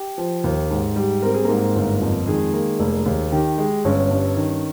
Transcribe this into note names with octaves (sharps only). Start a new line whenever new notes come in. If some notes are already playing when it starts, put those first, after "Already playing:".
Already playing: G4
F3
D#2
G#2
G3
C4 A#4
G#4
G#2 A#3 A#4
G1
F2
D#3 G#3 G#4
A#3
F1
D#2
D#3 G4
G#3
G1 C#4 C#5
G2
D#3